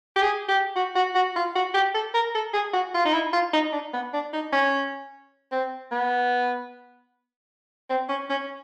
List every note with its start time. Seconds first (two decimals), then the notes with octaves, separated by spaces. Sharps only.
0.16 G4
0.22 G#4
0.49 G4
0.76 F#4
0.95 F#4
1.15 F#4
1.36 F4
1.55 F#4
1.74 G4
1.94 A4
2.14 A#4
2.35 A4
2.54 G#4
2.73 F#4
2.94 F4
3.05 D#4
3.13 E4
3.33 F4
3.53 D#4
3.73 D4
3.94 B3
4.13 D4
4.33 D#4
4.53 C#4
5.52 C4
5.92 B3
7.90 C4
8.09 C#4
8.30 C#4